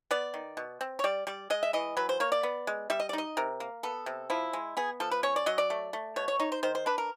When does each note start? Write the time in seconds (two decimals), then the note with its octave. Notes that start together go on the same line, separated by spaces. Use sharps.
0.11 B3 D5
0.34 D#3
0.57 B2
0.81 C4
0.99 C#5
1.04 G3 D5
1.27 G3 D5
1.50 G#3 D#5
1.63 E5
1.73 E3 D#5
1.97 F#3 B4
2.09 C5
2.20 A#3 C#5
2.32 D5
2.43 B3
2.67 G#3
2.90 G3 E5
3.00 D#5
3.09 D5
3.13 D#4 D#5
3.37 C3 A#4
3.60 A#3
3.83 B3 A4
4.06 C3
4.30 F3 E4
4.53 G#3
4.77 B3 G#4
5.00 F3 A4
5.11 B4
5.23 C#4 C#5
5.36 D5
5.46 F#3 D#5
5.58 D5
5.70 A3
5.93 A3
6.16 B2 C#5
6.28 C#5
6.39 D#4 C#5
6.52 C5
6.63 D#3 C5
6.75 C5
6.86 D4 B4
6.98 A#4